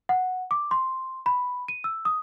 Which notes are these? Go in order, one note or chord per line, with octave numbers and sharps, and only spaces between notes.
F#5
D6
C6
B5
D#7
E6
D#6